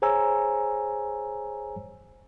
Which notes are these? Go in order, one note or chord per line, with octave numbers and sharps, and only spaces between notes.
G#4 C5 C#5 G#5 A#5 E6